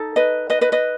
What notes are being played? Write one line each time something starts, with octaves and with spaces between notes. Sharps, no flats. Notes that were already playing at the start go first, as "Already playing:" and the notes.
Already playing: D#4 A4
B4 D#5
B4 D#5
B4 D#5
B4 D#5